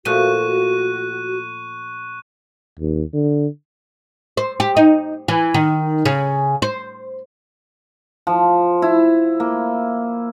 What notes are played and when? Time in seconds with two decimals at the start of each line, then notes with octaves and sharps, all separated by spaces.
0.05 A#2 F3 A3 F#4 C#6 F#6 D#7
2.80 D#2
3.14 D3
4.37 C5
4.60 G4
4.77 D#4
5.28 E3
5.54 D#3
6.05 C#3
6.62 C5
8.27 F3
8.82 E4
9.40 A#3